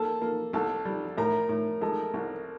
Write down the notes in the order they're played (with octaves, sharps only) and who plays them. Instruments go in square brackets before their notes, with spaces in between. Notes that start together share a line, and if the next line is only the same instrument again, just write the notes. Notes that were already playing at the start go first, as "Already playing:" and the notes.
Already playing: [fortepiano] A#3 [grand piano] A4 A5
[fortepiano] A#3
[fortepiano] C2 [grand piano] A4 A5
[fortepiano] G3
[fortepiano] A2 [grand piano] A#4 A#5
[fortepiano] A2
[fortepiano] G#3 [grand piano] A4 A5
[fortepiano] C2